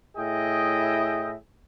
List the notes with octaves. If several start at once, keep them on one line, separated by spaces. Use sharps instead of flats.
A2 E4 G#4 D#5 E5 G5